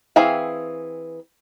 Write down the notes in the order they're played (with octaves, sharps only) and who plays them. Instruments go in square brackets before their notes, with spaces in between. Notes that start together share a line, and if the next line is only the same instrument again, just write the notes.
[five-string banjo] E3 C4 G#4 F5